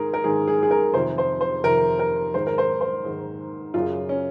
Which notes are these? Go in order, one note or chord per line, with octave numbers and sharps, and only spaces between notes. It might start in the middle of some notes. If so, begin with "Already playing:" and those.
Already playing: G#2 D#3 G#4 A#4
A#4
G#2 D#3 G#4
G#4
G#4
A#4
F2 C3 D#3 C5
C5
C5
F2 C3 D#3 A#4
A#4
G#2 D#3 C5
A#4
C5
C5
G#2 D#3
F#2 C#3 F4
C#4